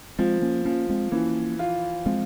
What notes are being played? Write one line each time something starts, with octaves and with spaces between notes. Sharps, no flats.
F3 G#3 C4
A#3 C#4
F3 A#3 C#4
G#3 C4
E3 A#3 C#4
F4
F3 G#3 C4